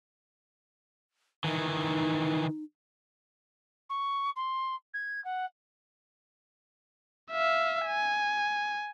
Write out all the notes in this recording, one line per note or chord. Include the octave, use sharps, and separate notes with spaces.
D#3 E3 D#4
C#6
C6
G#6
F#5
E5 F5
G#5